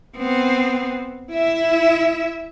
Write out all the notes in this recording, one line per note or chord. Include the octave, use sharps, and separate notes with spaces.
B3 C4
E4 E5